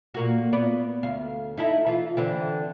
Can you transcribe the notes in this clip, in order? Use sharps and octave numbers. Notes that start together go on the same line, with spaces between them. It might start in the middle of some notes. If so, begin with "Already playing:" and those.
A#2 A#3 F#4
B3 D5
D2 F5
D#4 E4 A4
E3 F4
D3 E3 C4